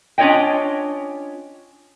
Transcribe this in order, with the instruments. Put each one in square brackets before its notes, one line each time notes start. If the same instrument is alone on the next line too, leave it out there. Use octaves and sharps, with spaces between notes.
[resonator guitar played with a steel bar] C#4 D4 F4 C#5 D#5 G5